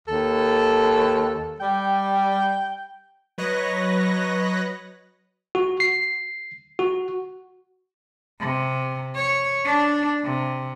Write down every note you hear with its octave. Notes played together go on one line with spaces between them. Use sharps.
D#2 A4
G3 G5
F#3 B4 C#5 D#5 F#6 A#6
F#4
C7
F#4
C3
C#5
D4
C3